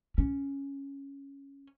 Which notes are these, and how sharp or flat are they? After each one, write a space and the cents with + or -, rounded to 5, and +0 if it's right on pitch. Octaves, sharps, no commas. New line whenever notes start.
C#4 +0